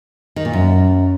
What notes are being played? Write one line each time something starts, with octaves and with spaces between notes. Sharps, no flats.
D#3
A#2
F#2